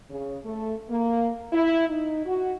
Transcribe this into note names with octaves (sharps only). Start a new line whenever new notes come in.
C#3
A3
A#3
E4
D#4
F#4